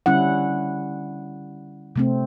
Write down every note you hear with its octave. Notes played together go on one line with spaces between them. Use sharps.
D3 G3 C#4 E4 F#5
C3 A3 C4